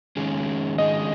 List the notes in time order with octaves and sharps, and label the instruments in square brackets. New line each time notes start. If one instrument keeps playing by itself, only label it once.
[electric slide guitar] D#3 G#3 C#4 G#4
[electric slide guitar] D#3 G#3 C#4 G#4 [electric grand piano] D#5